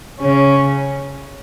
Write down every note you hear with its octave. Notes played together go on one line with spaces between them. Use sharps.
C#3 C#4